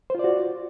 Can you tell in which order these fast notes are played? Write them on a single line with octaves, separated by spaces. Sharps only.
C5 F4 D5 F#4